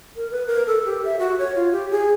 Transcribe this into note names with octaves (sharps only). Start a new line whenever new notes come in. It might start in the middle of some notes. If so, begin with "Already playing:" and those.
A#4
B4
A#4
A4
G4
E5
F#4
C#5
F4
G4
G#4